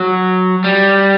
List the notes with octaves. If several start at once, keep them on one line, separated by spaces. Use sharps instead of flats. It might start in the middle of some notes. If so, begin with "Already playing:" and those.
Already playing: F#3
G3